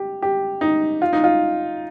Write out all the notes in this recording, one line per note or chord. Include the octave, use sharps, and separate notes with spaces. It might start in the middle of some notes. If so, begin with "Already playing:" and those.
Already playing: G4
G4
D#4
F4
D#4
F4